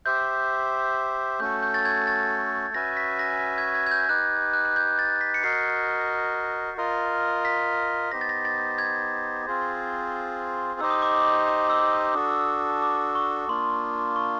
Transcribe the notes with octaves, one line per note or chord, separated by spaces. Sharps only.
G4 C5 E5 G6
A3 C#4 F#4 A4 G6
G6
A6
G#6
A6
C#4 F#4 B4 E5 G#5 A#6
B6
A#6
G#6
G#6
G#6
G6
D#4 G4 B4 F#6
F#6
F#6
G6
A6
B6
C#7
F#4 A#4 D#5 C7
F4 A#4 D#5
B6
B3 D#4 G4 C5 A#6
A6
A#6
A6
G#6
C4 F4 G#4 C5
D#4 G4 C5 D#5 E6
D#6
D6
D#6
D6
E6
D#6
D4 F#4 A4
D6
C#6
A#3 D4 F4 C6
C#6